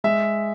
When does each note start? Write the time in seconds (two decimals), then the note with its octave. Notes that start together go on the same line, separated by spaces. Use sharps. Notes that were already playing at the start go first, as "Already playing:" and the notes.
0.04 G#3 E5